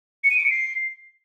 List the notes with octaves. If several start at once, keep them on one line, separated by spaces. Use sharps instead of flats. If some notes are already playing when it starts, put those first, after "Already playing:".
C#7
D#7
D7
C#7
C7